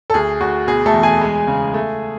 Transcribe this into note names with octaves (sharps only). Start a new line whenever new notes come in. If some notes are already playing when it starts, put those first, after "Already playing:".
A4
D2 G#4
D2 F#4
B2 G#4
A3 A4
E2
G#4 G#5
G#3
C#3
A3